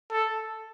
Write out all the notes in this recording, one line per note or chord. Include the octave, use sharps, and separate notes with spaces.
A4